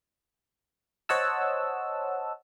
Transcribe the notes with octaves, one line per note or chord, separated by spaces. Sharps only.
C5 C#5 D#5 F#5 A5 E6